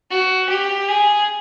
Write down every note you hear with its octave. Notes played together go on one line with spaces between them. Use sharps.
F#4
G4
G#4